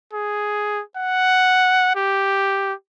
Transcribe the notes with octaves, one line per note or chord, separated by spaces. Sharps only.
G#4
F#5
G4